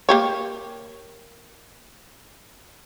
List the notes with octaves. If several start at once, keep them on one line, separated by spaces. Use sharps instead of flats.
A#3 G4 C#5